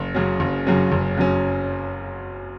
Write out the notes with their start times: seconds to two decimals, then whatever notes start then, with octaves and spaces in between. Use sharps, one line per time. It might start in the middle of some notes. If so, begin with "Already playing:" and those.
Already playing: F#1
0.15 F#2 C#3 F#3 C#4
0.40 F#1
0.67 F#2 C#3 F#3 C#4
0.92 F#1
1.18 F#2 C#3 F#3 C#4